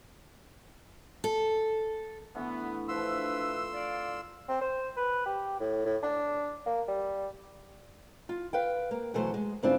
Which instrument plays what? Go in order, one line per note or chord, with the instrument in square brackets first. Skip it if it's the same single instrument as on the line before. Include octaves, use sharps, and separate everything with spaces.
[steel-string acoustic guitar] A4
[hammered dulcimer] D3 E3 A3 [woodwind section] B3
[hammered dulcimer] F3 [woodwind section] D4 B4 E5 [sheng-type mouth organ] C6 E6
[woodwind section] D5 F5
[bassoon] C4
C5
B4
G4
A2
A2
D4
A#3
G3
[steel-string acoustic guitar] F4
B4 F5 G5
A#3
B2 E3 F#3 A3 C5
G#3
G2 C#3 C4 D4 E4 F4